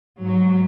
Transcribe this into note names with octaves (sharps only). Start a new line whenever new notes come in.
G#2 F#3